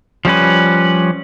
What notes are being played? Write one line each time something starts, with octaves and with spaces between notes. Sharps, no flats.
F3 G3 C#4 B4